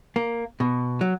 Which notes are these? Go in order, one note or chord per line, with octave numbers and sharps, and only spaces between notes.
A#3
B2
F#3